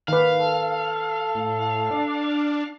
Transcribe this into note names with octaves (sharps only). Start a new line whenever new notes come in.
D#3 B4 F5
A4
A2
D4